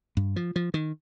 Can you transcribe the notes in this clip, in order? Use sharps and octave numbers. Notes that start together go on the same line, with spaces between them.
G2
F3
F3
D#3